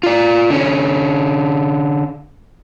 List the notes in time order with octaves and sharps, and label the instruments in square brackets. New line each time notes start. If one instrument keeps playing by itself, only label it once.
[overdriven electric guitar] F4 D5
D3 C#4